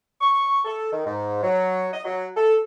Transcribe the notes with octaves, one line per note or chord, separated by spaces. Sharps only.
C#6
A4
D#3
G#2
F#3
D#5
F#3
A4